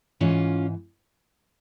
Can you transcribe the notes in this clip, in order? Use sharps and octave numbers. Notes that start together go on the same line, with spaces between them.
G#2 E3 C#4 F4